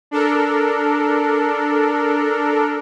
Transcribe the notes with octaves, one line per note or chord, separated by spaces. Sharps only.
D4 A4 A#4